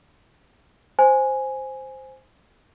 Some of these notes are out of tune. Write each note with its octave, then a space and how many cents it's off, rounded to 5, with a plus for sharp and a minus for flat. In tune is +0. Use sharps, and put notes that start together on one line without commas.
C5 +0 G#5 +0